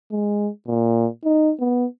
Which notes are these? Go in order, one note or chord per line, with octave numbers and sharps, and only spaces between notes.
G#3
A#2
D#4
B3